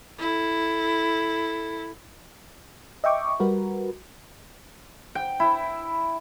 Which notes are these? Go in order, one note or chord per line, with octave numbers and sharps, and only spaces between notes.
E4 A4
D#5 E5 G5 C#6 D6
G3 F#4 A#4 B4
G5
E4